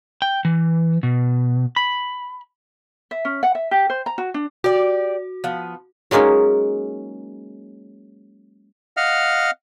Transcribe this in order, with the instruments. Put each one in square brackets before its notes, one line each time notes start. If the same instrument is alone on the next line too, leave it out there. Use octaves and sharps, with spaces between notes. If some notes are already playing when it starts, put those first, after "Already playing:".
[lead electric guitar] G5
E3
B2
B5
[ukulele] E5
C#4
F#5
E5
G4
C5
A#5
F#4
D4
[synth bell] F#4 [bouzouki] G4 D5
[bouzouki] F3 B3
[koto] F#3 G#3 A#3 C#4 D#4
[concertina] D#5 F5 F#5 F6